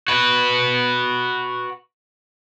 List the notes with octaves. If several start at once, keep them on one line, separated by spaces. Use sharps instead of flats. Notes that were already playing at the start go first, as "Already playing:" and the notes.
F#4 B4